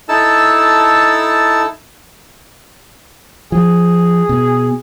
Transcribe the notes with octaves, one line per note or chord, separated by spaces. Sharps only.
D#4 E4 A4 A5 E6
F3 G#4
B2